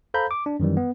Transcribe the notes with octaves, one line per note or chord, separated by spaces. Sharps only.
A4 C5 F5 A#5 B5 G6
D6
D4
F#2 D#3 E3 G3
B3